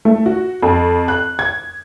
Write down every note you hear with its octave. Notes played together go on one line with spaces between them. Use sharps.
A3
F#4
F2
F#6
G#6